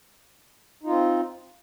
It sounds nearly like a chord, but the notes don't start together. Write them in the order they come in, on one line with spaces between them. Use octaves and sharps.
D#4 F4 C4